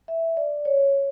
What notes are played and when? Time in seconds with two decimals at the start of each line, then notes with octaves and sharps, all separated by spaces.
0.08 E5
0.37 D5
0.65 C#5